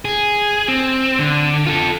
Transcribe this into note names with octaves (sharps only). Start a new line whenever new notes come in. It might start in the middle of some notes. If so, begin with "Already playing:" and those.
G#4
C4
D3
F4 A4